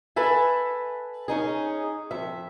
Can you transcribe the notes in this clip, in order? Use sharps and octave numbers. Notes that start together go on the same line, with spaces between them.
A4 B4 E5 G#5
C#4 D#4 G#4
F2 E5